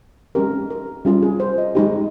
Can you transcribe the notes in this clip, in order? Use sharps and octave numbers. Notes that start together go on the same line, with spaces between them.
G#3 C#4 G4 A#4
A#4
G3 C#4 F4 G#4
G#4
C5
D#5
G#3 D#4 G4